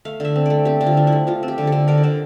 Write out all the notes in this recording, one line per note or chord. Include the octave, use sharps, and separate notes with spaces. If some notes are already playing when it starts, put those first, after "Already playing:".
A3 F5
D3 E5
C4
A3 D5
C4 G4
D3
F4
F3
E4
A3
F3 F4
C4
G4
D3
A4
D3
D3 A#4
D5
D3 C5